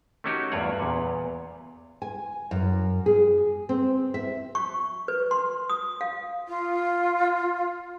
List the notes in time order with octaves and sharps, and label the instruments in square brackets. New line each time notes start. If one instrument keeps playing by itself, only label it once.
[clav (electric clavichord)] A3 A#3 C#4 D#4 F#4 G4
E2 G2 F4 C#5 F#5
E2 A#2
[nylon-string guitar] G#5
F#2
G#4
C4
E5
[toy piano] C#6
B4
C6
D#6
F5
[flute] F4